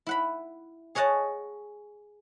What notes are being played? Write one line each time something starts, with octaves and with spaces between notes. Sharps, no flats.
E4 F#5 B5
G#4 C#5 D#5 F#5 A5